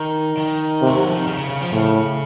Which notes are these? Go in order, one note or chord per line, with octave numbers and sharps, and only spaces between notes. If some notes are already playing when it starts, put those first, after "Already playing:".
Already playing: D#3
D#3
C3
A3
F#3
F3
D#3
C#3
C#3
C#3
F3
A2 C#3